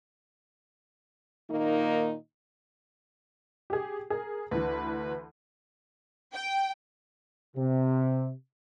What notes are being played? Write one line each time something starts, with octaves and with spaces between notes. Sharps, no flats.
A#2 D#3 A#3 D#4
G4 G#4
G#4 A#4
D2 E3 B4
G5
C3